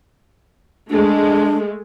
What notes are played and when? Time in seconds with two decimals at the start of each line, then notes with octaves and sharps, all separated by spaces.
0.90 G#3 A3 D4